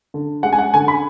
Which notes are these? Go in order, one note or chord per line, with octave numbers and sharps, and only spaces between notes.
D3
G#3 F#5
G#5
F#5
D3 G#5
B5